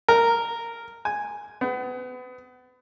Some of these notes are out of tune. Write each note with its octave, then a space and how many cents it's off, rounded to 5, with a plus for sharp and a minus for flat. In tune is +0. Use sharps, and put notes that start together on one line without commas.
A#4 -5
G#5 -5
B3 +30